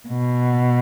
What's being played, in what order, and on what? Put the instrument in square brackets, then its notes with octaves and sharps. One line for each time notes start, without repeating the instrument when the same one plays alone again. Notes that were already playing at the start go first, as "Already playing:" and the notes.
[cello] B2